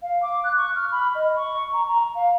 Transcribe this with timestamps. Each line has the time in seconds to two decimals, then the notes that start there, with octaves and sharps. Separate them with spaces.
0.02 F5
0.22 D6
0.44 F#6
0.58 C#6
0.75 F6
0.92 B5
1.15 D#5
1.36 C#6
1.73 A#5
1.88 A#5
2.15 F5